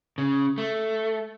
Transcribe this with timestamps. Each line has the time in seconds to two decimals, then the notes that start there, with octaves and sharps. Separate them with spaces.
0.18 C#3
0.58 A3